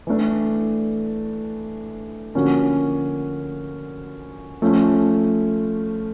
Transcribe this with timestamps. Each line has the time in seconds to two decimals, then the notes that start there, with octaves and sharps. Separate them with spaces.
0.07 E3 A3 D4
2.35 D3 F3 A#3 C#4 F#4
4.62 F3 A3 C#4